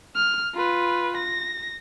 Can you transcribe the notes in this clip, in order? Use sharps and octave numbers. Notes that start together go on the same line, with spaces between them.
F6
F4 B4
A#6